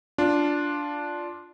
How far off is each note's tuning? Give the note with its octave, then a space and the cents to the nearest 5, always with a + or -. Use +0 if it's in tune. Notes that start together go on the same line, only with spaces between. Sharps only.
D4 -5 F4 +0